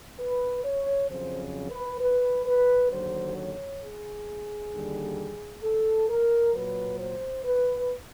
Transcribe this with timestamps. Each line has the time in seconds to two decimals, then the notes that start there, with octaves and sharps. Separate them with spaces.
0.19 B4
0.64 C#5
1.09 F2 C#3 F#3 C5
1.70 B4
2.00 B4
2.46 B4
2.91 D#2 D3 F#3 C5
3.37 C#5
3.82 G#4
4.72 D#2 D3 G3
5.63 A4
6.09 A#4
6.54 A#2 F#3 B4
6.99 C5
7.44 B4